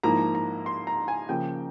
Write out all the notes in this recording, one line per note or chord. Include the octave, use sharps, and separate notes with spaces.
G#2 F3 A#3 E4 A#5
A#5
C6
A#5
G#5
C#3 F3 A#3 G5